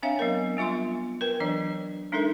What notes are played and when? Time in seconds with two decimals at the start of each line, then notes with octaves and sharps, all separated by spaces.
0.03 C4 D4 C#5 E5 F5 G5
0.19 F#3 B3 A#4
0.57 G3 B3 F4 E5 C6
1.21 A#4 B4 G5
1.40 E3 F#3 D4 D5
2.12 G#3 D4 D#4 A4 A#4 E5